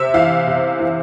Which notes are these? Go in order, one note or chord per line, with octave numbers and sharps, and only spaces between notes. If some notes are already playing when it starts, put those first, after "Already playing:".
Already playing: C3 E5
E3 F5
C3
E3